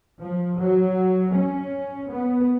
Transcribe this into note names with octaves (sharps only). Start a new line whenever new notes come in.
F3
F#3
C#4
B3